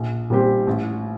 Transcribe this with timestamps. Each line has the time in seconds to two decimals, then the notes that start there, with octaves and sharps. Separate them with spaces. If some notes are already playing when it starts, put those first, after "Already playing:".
Already playing: A#1
0.30 A#2 G3 C4 G4
0.67 A1